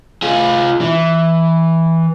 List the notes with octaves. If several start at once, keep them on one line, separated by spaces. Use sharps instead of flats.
F4 G#4
E3